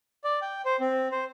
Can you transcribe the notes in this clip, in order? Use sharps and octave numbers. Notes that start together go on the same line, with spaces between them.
D5
G5
C5
C4
C5